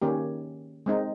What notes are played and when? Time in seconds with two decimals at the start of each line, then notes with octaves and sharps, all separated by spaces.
0.02 D#3 A#3 C#4 G4
0.86 G#3 C4 D#4